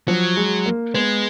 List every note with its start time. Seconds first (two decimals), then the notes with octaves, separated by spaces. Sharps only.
0.08 F3 F#3
0.37 G#3
0.66 A#3
0.94 G#3 B3